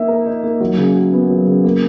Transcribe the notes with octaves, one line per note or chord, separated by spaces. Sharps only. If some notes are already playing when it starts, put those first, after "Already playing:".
Already playing: A#3 D#4 E5
A#4
D#4
A#3
F#3
C#3
F#4
B3
F#3
C#3
A#3